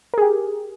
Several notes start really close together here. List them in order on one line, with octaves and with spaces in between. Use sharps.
A#4 G#4 G4